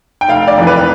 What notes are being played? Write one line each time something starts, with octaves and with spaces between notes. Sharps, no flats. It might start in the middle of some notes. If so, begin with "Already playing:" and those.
G5
F1 F5
D5
F2 E3
B4
B4